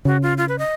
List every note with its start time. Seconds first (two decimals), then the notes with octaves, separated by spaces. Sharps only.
0.05 C#3 F#4
0.22 F4
0.38 F4
0.48 B4
0.58 D#5